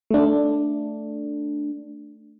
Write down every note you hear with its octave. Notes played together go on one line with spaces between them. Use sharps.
A3 D4